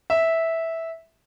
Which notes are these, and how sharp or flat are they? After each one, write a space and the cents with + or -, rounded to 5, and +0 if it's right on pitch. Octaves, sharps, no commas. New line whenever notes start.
E5 -10